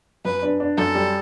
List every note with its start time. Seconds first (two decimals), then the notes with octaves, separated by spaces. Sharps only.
0.25 F#2 B4
0.42 D4
0.60 D4
0.77 F#2 A4
0.95 G3